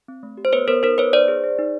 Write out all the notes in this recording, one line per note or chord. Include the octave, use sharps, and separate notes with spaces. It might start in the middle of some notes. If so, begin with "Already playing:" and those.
C4
A3
G4
C5
B3 B4 C#5
B3 A#4 C5
D#4 A#4 C5
B3 B4 C#5
D#4 C5 D5
G#4
G#4
D#4